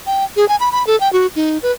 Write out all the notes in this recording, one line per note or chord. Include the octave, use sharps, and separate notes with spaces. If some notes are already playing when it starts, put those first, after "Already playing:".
G5
G#4
G#5
B5
B5
A4
G5
F#4
D#4
B4